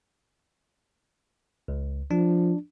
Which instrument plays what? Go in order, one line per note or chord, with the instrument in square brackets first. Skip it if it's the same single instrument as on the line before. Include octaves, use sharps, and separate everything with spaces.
[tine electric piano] C#2
[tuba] F3 [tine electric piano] D4